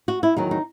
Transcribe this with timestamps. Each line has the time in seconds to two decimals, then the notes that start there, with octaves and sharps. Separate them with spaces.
0.08 F#4
0.23 E4
0.36 E2 D#3 F#3 D#4
0.51 D#4